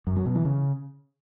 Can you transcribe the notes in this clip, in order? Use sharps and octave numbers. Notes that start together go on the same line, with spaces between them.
F#2
F#3
B2
E3
C#3